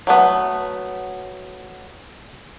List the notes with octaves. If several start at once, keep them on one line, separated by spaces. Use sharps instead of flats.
F#3 A3 B3